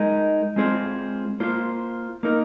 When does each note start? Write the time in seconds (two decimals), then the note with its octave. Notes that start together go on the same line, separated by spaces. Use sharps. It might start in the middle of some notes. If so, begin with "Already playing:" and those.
Already playing: G#3 D#4 A#4
0.56 G#3 C4 F4 G#4 C5
1.40 A#3 F4 C5
2.23 A#3 D#4 A#4